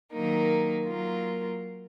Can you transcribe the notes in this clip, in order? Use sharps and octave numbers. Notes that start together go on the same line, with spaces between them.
D#3 F#3 A#3 D#4 A#4
F#3 A#3 F4 A#4